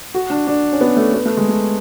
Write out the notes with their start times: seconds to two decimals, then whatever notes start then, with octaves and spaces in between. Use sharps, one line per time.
0.14 F#4
0.30 D4
0.47 D4
0.72 C#4
0.81 B3
0.97 A3
1.14 B3
1.26 A3
1.37 G#3
1.49 A3